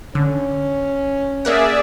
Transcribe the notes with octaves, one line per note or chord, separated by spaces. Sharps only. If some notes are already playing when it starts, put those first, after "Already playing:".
D3 C#4
A#3 G#4 A#4 D5 E5 F#5